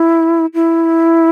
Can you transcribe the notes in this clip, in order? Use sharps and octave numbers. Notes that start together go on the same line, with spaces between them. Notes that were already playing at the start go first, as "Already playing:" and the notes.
Already playing: E4
E4